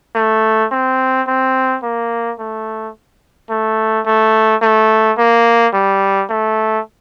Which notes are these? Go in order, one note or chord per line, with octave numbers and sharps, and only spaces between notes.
A3
C4
C4
A#3
A3
A3
A3
A3
A#3
G3
A3